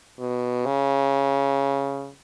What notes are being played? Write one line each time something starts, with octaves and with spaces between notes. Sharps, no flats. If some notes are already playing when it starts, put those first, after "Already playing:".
B2
C#3